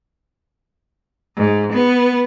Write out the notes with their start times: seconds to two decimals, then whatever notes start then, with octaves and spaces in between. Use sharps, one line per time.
1.36 G#2
1.73 B3